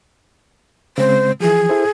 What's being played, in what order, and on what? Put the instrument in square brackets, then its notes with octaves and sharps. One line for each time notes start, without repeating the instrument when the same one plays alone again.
[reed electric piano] C#3 G#3 C4 [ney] C5
[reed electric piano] E3 F3 [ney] G#4
[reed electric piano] E4 A4 C5